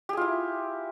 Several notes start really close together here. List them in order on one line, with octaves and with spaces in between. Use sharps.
G4 G#4 F4 E4